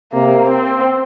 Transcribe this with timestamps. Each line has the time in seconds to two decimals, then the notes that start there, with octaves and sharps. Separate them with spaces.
0.13 C3 A#3
0.49 C4